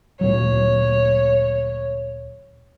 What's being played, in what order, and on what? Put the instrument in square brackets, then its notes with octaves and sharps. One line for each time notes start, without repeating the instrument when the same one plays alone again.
[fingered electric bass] D2 A#2 F#3 [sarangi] C#5